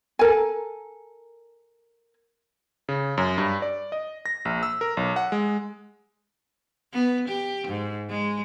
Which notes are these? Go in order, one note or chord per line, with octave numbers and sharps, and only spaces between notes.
A4 A#4 G#5
C#3
F#2
G2
D5
D#5
A#6
A#1
E6
A#4
B1
F#5
G#3
B3
G4
G#2
G#3